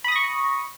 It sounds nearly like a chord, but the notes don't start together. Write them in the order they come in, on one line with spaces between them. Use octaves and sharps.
B5 D#6 A#6 C#6